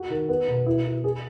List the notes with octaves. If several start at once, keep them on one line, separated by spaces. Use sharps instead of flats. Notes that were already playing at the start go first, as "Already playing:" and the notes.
Already playing: F#4
D#3
B3
B2
E4
E4
G#4